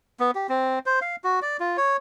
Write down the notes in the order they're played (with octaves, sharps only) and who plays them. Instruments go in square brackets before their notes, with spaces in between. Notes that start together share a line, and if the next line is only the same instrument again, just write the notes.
[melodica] B3
G4
C4
C5
F5
F#4
D5
F4
C#5